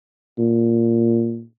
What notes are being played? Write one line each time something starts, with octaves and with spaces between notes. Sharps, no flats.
A#2